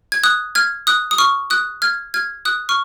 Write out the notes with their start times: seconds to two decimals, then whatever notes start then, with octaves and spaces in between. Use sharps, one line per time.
0.12 G#6
0.23 D#6 F#6
0.55 F6 G#6
0.87 D#6 F#6
1.11 D#6
1.18 C#6 F6
1.50 D#6 F#6
1.82 F6 G#6
2.14 F6 G#6
2.45 D#6 F#6
2.69 C#6 F6